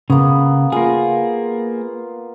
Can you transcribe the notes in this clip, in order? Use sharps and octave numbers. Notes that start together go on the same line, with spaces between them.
C#3 A#3 B3
A#3 F4 G#4